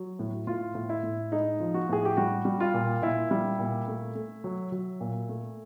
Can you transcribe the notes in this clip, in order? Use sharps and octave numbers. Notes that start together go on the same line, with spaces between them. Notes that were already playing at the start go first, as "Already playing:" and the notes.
Already playing: F#3
A2
A2 F4
A2
E4
A2
G#3 D#4
F3
F#4
A2 G#4
G4
G3 F#4
G3
F4
A#2
A#2 E4
G3
A#2
A3
A3
F#3
F#3
A#2
A3